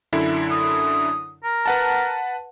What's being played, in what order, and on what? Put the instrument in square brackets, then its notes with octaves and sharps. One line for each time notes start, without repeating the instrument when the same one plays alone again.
[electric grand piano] F#2 D3 E4
[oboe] D#6
A#4
[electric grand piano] B4 F#5 A5